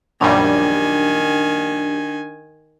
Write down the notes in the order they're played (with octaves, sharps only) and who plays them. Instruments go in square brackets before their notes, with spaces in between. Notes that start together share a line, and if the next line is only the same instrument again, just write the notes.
[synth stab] A#1 F#2 G3 [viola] D#3 G#5 [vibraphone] D4